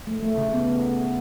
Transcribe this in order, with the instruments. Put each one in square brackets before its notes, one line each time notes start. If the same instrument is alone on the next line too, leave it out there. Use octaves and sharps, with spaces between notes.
[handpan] A3
A3
C#3
B3